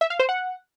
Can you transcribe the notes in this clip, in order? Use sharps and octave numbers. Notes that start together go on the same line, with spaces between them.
E5
F5
C5
F#5